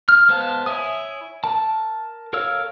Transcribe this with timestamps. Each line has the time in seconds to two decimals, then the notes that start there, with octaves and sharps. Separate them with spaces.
0.09 F6
0.29 G#3 B3 C5 F5 A5
0.66 E4 C#5 E5 G#5 D#6
1.44 A#4 A5
2.33 A4 A#4 C#5 F5 E6